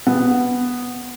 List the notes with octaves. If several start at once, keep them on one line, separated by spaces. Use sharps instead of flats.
B3